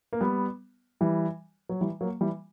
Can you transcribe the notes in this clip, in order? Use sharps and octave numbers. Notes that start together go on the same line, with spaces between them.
A#3
G3 B3
E3 G3
F#3
E3 G3
F#3 A#3
E3 G3